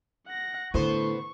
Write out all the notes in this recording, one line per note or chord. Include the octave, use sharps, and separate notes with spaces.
F#5 A#6
A2 D3 B3 C5 C#6